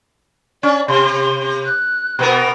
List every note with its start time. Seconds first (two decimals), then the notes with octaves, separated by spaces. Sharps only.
0.63 C#4 D5
0.88 C3 C6
1.21 C6
1.66 F#6
2.19 B2 B3 A#4